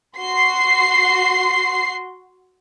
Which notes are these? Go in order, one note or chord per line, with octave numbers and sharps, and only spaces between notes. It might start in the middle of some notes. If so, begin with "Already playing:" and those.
F#4 C6 C7